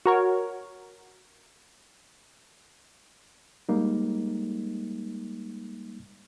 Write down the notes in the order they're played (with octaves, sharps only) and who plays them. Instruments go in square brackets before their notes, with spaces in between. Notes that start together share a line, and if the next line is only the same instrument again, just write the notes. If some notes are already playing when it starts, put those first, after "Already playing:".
[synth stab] F#4 A#4 C#5
[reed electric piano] G3 G#3 A#3 D#4